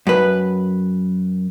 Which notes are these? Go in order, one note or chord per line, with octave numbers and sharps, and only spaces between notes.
F#2 B4